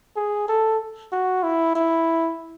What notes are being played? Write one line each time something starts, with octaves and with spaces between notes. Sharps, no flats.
G#4
A4
F#4
E4
E4